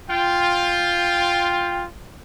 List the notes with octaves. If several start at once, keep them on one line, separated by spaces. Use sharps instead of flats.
F4 G5